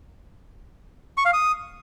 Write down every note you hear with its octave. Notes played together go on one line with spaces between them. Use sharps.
C#6
F5
D#6